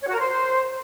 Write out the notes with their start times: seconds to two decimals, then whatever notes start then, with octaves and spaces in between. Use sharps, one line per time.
0.02 C#5
0.08 F#4
0.14 A#4
0.20 C5